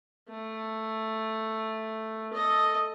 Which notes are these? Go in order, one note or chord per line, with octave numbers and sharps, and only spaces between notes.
A3
A4 D#5